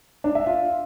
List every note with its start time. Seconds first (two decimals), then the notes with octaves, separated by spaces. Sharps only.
0.24 D4
0.35 E5
0.46 F4